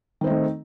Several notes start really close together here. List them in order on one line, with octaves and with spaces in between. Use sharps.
D#3 C4 D#4 A3